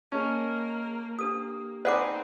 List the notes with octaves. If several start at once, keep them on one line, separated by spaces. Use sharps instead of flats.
A#3 C#4 G#4 A#4 D#5 A5
A#3 D4 G4 A4 D#6
C4 D#4 G#4 B4 D5 F#5 D6